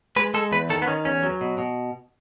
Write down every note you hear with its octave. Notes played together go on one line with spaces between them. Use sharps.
G#3 B4
G#3 A4
E2 B4
D#3 A4
B3
D#3 C#4
E2 C#4
F#3
B2
B2